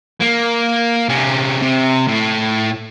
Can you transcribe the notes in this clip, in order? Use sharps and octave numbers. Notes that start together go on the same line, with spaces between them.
A#3
C3 C#4
C3
A2